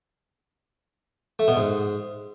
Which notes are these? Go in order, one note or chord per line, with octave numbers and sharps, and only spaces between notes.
A3
B2
G#2